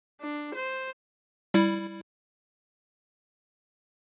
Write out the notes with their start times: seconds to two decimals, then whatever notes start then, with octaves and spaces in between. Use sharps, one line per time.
0.21 D4
0.55 C5
1.54 G3 E4